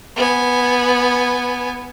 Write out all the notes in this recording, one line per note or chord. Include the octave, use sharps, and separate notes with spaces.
B3 G#5